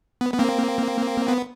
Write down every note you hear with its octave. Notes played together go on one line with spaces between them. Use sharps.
B3
B3
A#3 C4
B3